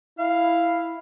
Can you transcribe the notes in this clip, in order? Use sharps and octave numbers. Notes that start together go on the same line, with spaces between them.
E4 F5